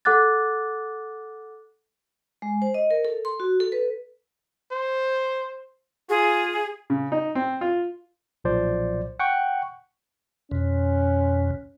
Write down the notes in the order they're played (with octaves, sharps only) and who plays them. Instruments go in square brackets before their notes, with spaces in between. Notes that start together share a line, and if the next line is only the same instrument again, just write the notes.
[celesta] A4 F#5 D6 F#6 A6
[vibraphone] G#3
C5
D#5
A#4
A4
C6
F#4
A4
B4
[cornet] C5
[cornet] F4 [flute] G#4
[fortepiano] C#3
D#4
C4
F4
[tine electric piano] B1 A#2 F3 C5 D5
F#5 G5 C#6
[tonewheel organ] F2 B2 [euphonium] C#4